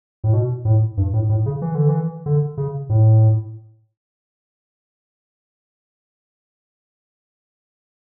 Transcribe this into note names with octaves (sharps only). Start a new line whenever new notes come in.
A2
B2
A2
G2
A2
A2
C#3
E3
D3
E3
D3
C#3
A2